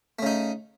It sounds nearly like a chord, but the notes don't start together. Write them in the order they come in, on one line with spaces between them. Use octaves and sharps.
A3 C#3 D#4